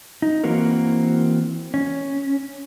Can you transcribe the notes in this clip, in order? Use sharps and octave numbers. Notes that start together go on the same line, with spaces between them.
D#4
E3 A#3 C4 F#4 A#4
C#4